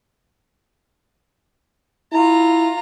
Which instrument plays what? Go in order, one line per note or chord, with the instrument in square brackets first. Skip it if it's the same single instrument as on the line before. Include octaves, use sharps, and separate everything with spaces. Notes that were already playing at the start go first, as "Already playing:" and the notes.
[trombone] E4 [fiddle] F4 A#5